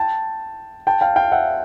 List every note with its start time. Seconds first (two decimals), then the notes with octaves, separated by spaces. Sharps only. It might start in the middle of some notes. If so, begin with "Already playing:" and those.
Already playing: G5 A5
0.87 G5 A5
1.01 F5 G5
1.16 F5 G5
1.32 E5 F#5